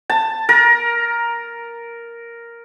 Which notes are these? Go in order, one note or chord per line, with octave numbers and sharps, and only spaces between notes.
A5
A#4